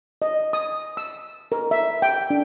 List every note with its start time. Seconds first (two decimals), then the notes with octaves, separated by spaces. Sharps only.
0.22 D#5
0.53 D#6
0.97 E6
1.52 A#4
1.71 E5
2.02 G5
2.30 D4